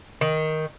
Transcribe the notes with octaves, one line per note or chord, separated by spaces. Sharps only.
D#3